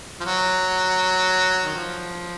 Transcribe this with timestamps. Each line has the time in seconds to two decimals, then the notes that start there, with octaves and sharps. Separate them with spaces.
0.20 F3
0.25 F#3
1.64 D#3
1.75 F3